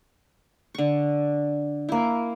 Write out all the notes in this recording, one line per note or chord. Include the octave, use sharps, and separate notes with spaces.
D3 C#6
A#3 E4